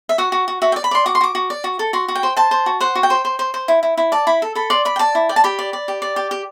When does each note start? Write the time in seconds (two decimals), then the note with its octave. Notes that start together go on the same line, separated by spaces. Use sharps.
0.09 E5
0.18 F#4 F#5
0.32 F#4
0.48 F#4
0.62 F#4 E5
0.72 G5
0.76 D5
0.84 B5
0.91 D5 C6
1.06 F#4 D6
1.15 C6
1.21 F#4 D6
1.35 F#4
1.50 D5
1.64 F#4
1.79 A4
1.93 F#4 C6
2.08 F#4
2.15 G5
2.23 C5
2.37 C5 A5
2.51 C5
2.66 F#4
2.80 C5 F#5
2.95 F#4
3.03 G5
3.10 C5
3.25 C5
3.39 C5
3.54 C5
3.68 E4
3.83 E4
3.97 E4
4.12 D5 A5
4.27 E4 B5
4.42 A4
4.55 A4 B5
4.70 D5 C6
4.85 D5 B5
4.96 G5
4.99 D5 A5
5.15 E4
5.29 D5 G5
5.36 A5
5.44 G4 B5
5.59 D5
5.73 D5
5.88 G4
6.02 D5
6.16 G4
6.31 G4